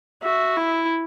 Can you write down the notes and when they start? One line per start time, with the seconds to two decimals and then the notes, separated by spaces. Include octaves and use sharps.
0.22 F#4 E5
0.57 E4